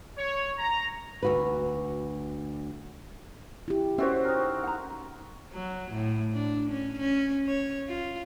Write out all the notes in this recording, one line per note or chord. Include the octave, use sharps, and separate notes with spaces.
C#5
A#5
D2 F#4 B4
E4 G4
C4 C#4 F#4 C5 D5 E5
D#4 A#4
F#5 A#5
F#3
A2
D4
C#4
C#4
C#5
F4